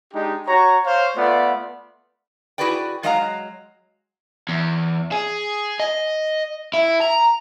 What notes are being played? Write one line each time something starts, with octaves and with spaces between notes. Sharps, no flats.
G#3 D4 D#4 G4
F#4 C#5 A#5
C5 C#5 F5
A3 B3 F4 D5
E4 F#4 G#4 B4 D5 G5
F#3 G#3 D#5 F5 G#5 A#5
E2
G#4
D#5
E4
A#5